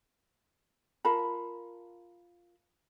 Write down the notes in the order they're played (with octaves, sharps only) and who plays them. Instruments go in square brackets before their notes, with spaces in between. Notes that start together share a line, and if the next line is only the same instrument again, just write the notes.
[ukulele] F4 A#4 A5 B5